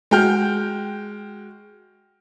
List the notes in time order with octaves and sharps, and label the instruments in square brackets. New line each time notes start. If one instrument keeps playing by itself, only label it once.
[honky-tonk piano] G#3 F#4 G5 F6 G6